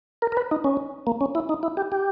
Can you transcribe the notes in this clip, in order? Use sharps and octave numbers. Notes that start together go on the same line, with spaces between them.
A#4
A#4
B4
D#4
C#4
A#3
C#4
E4
D#4
E4
G4
G4